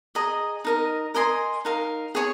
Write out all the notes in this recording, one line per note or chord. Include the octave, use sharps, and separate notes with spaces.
G#4 D#5 A#5 D#6
D#4 A#4 D#5
A#4 D#5 G#5 C6
D#4 A#4 F5
G#4 C#5 G#5 C#6